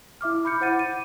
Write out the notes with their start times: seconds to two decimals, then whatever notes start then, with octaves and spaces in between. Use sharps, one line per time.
0.21 E4 E5 D6 F6
0.45 B5 D6 G6 C#7
0.60 E4 C5 F#5 A6 D#7
0.79 D#7